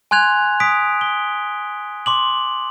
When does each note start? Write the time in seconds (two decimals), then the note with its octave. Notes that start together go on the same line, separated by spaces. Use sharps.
0.11 G#5 C6 F#6 G#6 F7
0.60 D#6 B6 D7
1.01 G7
2.06 C6 D6 F#7